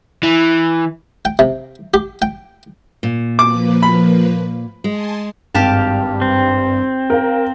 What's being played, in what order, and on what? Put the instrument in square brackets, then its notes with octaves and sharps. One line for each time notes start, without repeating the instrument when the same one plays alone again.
[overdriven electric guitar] E3
[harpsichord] G5
C3
G4
G5
[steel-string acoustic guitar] A#2
[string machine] F3 A#3 B4 [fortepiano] D6
[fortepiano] B5
[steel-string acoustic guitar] G#3 [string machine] G#5 A5 C6
[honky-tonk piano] G#1 [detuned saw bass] G2 [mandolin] G4 F5 A5
[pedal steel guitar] C4
[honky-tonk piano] A#4 F5